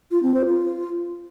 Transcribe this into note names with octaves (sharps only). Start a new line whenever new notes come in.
F4
C4
C5
F4